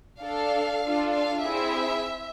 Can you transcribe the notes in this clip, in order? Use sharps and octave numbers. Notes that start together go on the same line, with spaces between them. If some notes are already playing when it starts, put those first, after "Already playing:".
D4 A4 F5
D4 F4 A4
F5
C4 E4 G#4 E5